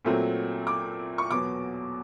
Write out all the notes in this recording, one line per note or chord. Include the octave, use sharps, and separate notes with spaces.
A#2 F#3 A3 C4
D6
C#6
E2 B2 F#3 B3 D6